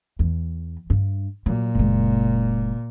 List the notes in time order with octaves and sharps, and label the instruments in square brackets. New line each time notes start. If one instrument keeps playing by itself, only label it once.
[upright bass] E2
G2
[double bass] A#2 [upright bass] F#3
[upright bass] F#1 G#3